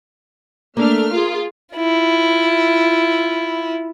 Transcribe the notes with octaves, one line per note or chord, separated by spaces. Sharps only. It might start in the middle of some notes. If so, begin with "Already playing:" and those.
A3 A#3 D4 F6
F4 G#4
E4 F4